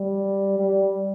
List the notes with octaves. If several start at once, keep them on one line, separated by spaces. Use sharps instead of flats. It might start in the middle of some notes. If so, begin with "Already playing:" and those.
Already playing: G3
G3